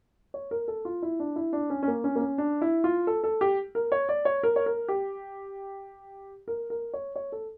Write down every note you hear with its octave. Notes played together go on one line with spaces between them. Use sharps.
C#5
A#4
A4
F4
E4
D4
E4
D4
C#4
C#4
A#3
C#4
A#3
C#4
D4
E4
F4
A4
A4
G4
A#4
C#5
D5
C#5
A#4
C#5
A#4
G4
A#4
A#4
C#5
C#5
A4